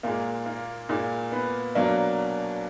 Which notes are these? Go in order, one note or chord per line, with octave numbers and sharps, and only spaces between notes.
A#2 G#3 A#3
A#3
A#2 G#3 A#3
B3
B2 F#3 A#3 D4